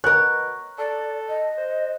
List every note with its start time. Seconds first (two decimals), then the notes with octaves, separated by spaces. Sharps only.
0.04 B2 A#4 C#5 F#6
0.78 A4 D5
1.28 D#5
1.57 C5